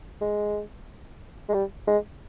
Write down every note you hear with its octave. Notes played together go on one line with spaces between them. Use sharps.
G#3
G#3
G3
G#3